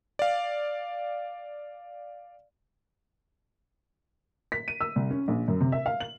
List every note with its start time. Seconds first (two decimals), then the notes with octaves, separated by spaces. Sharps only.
0.19 D5 F5
4.52 B6
4.68 D#7
4.81 E6
4.96 C2
5.11 C#4
5.28 A#1
5.48 F#2
5.61 C3
5.72 E5
5.86 F5
6.00 F#7